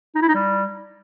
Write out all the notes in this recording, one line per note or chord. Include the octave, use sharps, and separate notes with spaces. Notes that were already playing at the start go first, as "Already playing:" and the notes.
D#4
E4
D#4
G3